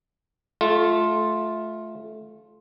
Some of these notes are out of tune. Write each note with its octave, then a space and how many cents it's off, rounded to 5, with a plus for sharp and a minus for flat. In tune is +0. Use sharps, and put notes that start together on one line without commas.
A3 -20 F4 +5